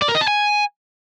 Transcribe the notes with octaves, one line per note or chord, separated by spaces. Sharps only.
D5
A#4
D#5
A5
G#5